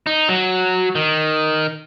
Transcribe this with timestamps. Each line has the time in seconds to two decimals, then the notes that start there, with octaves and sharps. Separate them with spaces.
0.06 D#4
0.29 F#3
0.95 D#3